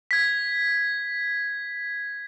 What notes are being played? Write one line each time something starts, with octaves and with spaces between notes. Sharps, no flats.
G#6 B6